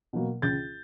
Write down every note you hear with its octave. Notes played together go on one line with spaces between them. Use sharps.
B2 F#3 A#3
C#2 G6 A6